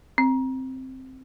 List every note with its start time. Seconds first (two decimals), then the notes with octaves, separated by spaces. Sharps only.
0.18 C4